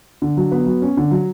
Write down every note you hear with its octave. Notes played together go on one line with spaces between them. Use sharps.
D3
F#3
B3
F#3
C#4
D3
F#3